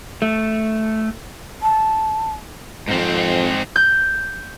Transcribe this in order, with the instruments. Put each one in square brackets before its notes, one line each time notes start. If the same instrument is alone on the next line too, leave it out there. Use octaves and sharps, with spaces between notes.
[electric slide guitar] A3
[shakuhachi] A5
[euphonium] F2 [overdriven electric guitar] G#2 C4
[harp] G6